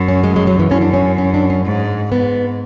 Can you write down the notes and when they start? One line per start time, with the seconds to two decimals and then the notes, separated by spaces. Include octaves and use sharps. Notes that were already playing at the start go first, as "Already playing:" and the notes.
Already playing: F#2
0.08 C#4
0.24 G#3
0.36 G#3
0.47 F#3
0.59 E3
0.71 F#2 C#4
0.81 D4
0.93 C#4
1.18 C#4
1.34 D4
1.50 C#4
1.65 G#2
2.12 G#2 B3